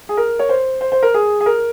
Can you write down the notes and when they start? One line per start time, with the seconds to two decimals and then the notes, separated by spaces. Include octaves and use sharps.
0.09 G#4
0.17 A#4
0.39 C#5
0.49 C5
0.81 C5
0.92 C5
1.03 A#4
1.14 G#4
1.41 G#4
1.46 A#4